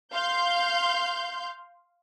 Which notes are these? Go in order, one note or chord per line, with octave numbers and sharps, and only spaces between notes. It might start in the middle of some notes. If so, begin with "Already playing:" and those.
F5 C6 G6